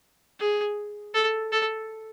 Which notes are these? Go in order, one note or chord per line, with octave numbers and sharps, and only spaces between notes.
G#4
A4
A4